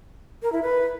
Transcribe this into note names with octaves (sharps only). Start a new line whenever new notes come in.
A#4
E4
B4